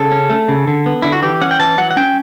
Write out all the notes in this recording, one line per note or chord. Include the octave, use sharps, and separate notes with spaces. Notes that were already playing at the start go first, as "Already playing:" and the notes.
Already playing: C#3 A4
C#4
A3
C#3
D3
B3
D3 E4
F#4
E3 G4
C#4 F#5
G5
E3 A5
F#3 F#5
F#5
C#4 G5